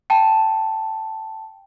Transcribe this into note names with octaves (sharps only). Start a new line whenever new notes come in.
G5 A5